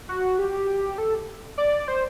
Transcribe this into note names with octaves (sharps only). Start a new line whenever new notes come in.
F#4
G4
A4
D5
C5